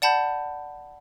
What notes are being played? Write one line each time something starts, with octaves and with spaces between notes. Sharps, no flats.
D5 F#5 A5 B5 G6